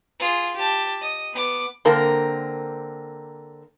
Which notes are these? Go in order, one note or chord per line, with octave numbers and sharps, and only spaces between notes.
F4 G#4
G4 A5
D#5
B3 D6
D3 A#3 C4 A#4